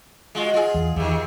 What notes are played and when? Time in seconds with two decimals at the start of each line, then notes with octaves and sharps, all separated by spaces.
0.35 G#3 F4 F#4
0.54 F4 G#4
0.74 E2
0.96 E2 C3 D#3